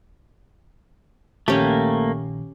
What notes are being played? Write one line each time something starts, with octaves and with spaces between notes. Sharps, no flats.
A#1 A#2 D#3 A3 A#3 C#4 G4